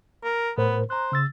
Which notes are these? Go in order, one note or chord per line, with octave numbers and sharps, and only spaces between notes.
A#4
A2 B3 A#4 C5
C5 A#5 F#6
C#3 E6 A6